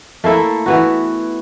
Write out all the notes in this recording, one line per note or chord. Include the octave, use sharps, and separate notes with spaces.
A3 A#3 E4 A4
E3 B3 F#4